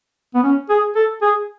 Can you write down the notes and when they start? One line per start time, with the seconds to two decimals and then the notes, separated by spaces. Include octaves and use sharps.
0.34 B3
0.43 C#4
0.70 G#4
0.95 A4
1.22 G#4